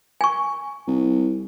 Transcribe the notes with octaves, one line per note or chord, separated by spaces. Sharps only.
G#5 C#6
C2